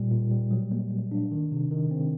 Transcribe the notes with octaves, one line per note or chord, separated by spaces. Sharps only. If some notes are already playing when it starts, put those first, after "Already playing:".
Already playing: A#2 G3
A#2
G3
F#3
A#3
F#3
D4
D#3
C3
D#3
C4